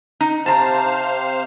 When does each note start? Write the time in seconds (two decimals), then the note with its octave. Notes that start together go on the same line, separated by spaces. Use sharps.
0.21 D#4
0.46 C3 C5 F5 A5 A#5